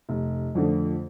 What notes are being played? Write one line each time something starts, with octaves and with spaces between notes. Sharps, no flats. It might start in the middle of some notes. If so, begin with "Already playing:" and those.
F1
F2 D3 F3 A3